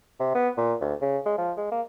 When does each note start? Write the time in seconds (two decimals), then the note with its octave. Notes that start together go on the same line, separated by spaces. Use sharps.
0.20 C3
0.35 B3
0.57 A#2
0.81 D2
1.01 C#3
1.26 G#3
1.38 F3
1.57 G#3
1.71 A#3